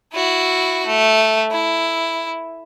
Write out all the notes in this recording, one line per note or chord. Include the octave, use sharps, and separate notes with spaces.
E4 F#4
A3
E4